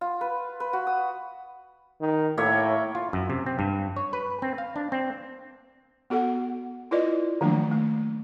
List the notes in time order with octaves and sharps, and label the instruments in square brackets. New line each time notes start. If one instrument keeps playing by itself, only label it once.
[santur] F4
B4
B4
F#4
D#6
[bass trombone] D#3
[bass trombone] A2 [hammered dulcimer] A#3 C#5 E5
[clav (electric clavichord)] F4
F#2
C3
C4
G2
C#5
B4
C4
F5
D4
C4
[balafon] B3 F#4 A4 F#5
E4 F4 B4 D5 D#5
D#3 F3 F#3 A3 A#3 D4
A3